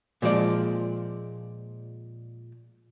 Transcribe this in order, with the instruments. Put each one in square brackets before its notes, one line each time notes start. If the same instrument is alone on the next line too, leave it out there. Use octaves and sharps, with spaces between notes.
[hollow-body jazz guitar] A#2 F3 G#3 D5